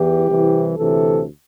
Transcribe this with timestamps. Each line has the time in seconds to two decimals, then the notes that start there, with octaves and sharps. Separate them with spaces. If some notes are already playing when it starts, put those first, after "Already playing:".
Already playing: E2 E3 G4
0.26 C2 C3 E3
0.76 D2 C3 E3 A4